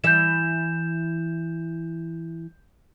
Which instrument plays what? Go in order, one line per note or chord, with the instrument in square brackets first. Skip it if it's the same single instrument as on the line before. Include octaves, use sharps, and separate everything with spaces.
[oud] E3 E4 E5 [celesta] G6 E7